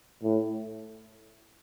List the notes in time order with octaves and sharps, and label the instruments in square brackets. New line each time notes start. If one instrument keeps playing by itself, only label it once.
[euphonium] A2